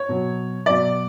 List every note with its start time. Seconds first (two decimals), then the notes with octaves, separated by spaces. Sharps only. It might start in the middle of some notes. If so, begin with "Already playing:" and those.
Already playing: C#5
0.09 B2 F#3
0.66 B2 F#3 D5